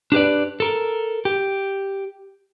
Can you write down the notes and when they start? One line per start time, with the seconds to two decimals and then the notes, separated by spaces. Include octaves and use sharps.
0.12 D4 G4 B4 D5
0.60 A4 A#4
1.25 G4